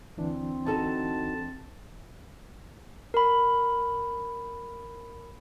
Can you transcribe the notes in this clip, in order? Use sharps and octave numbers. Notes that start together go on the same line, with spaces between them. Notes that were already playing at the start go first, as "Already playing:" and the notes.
D2 E3 C4 D4
D#4 F#4 A4 A5
A#4 B5